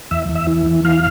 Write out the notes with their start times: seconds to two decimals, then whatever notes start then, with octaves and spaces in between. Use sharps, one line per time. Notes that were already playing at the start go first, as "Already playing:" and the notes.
0.11 E2 E5
0.29 E2
0.35 E5
0.47 E3
0.66 E2
0.85 E3 F5